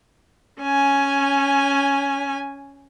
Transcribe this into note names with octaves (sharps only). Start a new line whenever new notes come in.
C#4 G#5